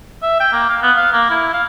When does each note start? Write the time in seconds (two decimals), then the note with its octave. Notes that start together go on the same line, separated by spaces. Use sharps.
0.23 E5
0.40 G5
0.53 A#3
0.69 F5
0.82 B3
0.97 F5
1.13 A#3
1.30 E4
1.53 F5